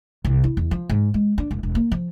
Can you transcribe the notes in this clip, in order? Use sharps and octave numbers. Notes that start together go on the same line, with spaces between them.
C2
E4
E2
F3
G#2
G#3
D4
E1
E1
A#3
F3